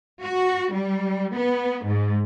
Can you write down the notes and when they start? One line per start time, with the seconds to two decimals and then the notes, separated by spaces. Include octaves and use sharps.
0.21 F#4
0.73 G3
1.35 B3
1.85 G#2